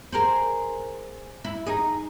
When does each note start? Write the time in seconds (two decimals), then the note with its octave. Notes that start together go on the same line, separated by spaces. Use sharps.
0.12 G#4 A#4 C5
1.44 E4
1.67 D#4 G#4